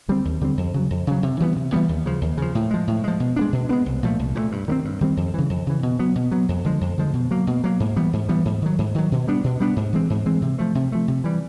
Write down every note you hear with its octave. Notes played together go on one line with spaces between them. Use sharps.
D3 G3 C4
D#2
D3 G3 C4
F2
C#3 F#3
F2
C#3 F#3
C3
E3 G3 B3
C3
E3 G3 B3
D#2
C#3 F3
D#2
C#3 F3
A2
F3 G#3
A2
F3 G#3
B2
G#3 B3 D4
B2
G#3 B3 D4
C2
A#2 F3 A3
C2
A#2 F3 A3
G2
D#3 G3 C4
G2
D#3 G3 C4
F2
C#3 E3
F2
C#3 E3
B2
F#3 B3
B2
F#3 B3
F2
D3 F3 G#3
F2
D3 F3 G#3
B2
F#3 A#3
B2
F#3 A#3
G#2
E3 G3 B3
G#2
E3 G3 B3
G#2
D#3 F#3
G#2
D#3 F#3
B2
G3 B3 D4
B2
G3 B3 D4
G#2
E3 G#3 C4
G#2
E3 G#3 C4
C3
F3 A3
C3
F3 A3
C3
E3 G3